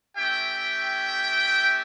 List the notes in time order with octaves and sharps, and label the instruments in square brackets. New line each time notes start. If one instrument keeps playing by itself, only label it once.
[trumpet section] A3 C#4 G4 E5 G5